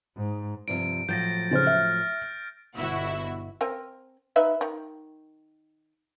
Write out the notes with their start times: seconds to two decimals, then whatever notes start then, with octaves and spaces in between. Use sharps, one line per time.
0.17 G#2
0.68 G2 C3 F3 D7
1.09 A2 F3 F#3 G6 A6 A#6
1.51 C#3 C#4 C5 F6 A6
1.67 E5
2.75 G1 B2 E4 F#4 E5
3.61 C4 A#4 G#5
4.36 D#4 B4 E5
4.61 D#3